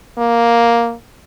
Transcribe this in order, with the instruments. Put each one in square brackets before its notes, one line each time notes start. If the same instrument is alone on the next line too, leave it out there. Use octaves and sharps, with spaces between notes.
[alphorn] A#3